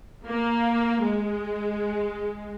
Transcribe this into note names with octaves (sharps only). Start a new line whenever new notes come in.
A#3
G#3